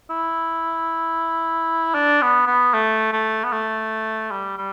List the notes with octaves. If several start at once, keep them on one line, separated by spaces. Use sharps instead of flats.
E4
D4
B3
B3
A3
A3
B3
A3
G3
G3